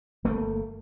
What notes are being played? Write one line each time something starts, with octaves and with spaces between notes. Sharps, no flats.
G1 A3 A#3